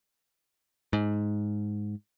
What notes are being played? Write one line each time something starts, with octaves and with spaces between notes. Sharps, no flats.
G#2